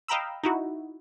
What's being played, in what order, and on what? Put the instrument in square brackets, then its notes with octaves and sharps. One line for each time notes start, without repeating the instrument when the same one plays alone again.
[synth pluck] D#5 F5 G5 A#5 B5 E6
D#4 E4 F#4